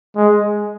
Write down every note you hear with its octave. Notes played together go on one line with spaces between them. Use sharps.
G#3